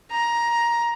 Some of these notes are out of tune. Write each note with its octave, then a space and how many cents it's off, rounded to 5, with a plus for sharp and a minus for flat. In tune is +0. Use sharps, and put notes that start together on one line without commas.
A#5 +15